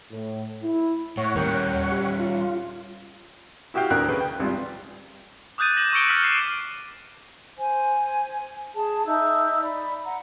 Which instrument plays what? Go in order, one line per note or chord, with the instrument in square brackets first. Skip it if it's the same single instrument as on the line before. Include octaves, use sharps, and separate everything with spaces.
[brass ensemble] A2
E4
[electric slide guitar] A2 [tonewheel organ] C#5 F#5
[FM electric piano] D#2 A#4 G5 [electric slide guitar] G3 C#4
[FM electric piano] G4
[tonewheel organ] F4
[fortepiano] E4 F#4 G4 F5 G5
D2 A#4 F#6
C#3 B4 G5
G5
G#1 G3 F4
[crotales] D6 D#6 F#6 G6 A6 D#7
A#6 E7 F#7
C#6 E6 G6 C#7 D7 G7
D6 F6 B6 F#7
D6 C7 D#7 E7
[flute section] C5 G#5
G#4 A5
D#4 E5 E6 G6
D5 B5
F#5 A#5